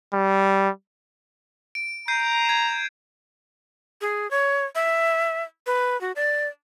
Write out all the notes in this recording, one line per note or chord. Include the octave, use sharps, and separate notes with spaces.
G3
D7
A#5 G6 C7 D#7
G#6 E7
G#4
C#5
E5
B4
F#4
D5